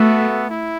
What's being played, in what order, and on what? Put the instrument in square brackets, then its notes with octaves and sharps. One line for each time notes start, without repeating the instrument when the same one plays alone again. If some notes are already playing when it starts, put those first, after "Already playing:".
Already playing: [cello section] A3 [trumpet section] B3 F#4 A4 E5
[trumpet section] E4